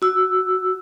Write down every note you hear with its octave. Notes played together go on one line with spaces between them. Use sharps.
F#4 E6